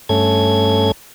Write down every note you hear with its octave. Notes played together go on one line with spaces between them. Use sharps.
G2 A3 C#4 A4 G#6